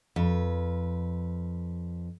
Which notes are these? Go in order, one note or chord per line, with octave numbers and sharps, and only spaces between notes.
F2 B4